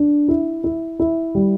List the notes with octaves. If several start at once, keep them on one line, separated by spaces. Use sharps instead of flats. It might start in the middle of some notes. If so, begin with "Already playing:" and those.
Already playing: D4
E4
E4
E4
G3